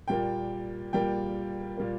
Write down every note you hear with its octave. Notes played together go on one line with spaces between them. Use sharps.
A#2 G3 A#3 G5
A#2 G3 A#3 G5
A#2 G3 A#3